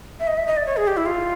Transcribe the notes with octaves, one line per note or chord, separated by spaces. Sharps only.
E5
D#5
E5
D#5
D5
C#5
G#4
G4
E4
F4